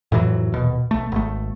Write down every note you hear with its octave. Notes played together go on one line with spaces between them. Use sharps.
F2 A2 E3 F#3
D#1 B2
B1 A3
G#1 A3